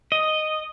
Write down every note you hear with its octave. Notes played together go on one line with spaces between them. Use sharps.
D#5